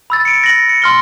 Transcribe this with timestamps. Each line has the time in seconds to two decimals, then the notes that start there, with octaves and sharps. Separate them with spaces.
0.10 B5 E6 A6
0.25 C#7 D7
0.44 A#6 F#7
0.69 C#7
0.82 C6 F6 G7